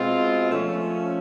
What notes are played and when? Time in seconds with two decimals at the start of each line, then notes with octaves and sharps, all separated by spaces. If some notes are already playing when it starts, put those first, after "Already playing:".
Already playing: B2 G#3 C4 F4
0.50 F3 A3 C#4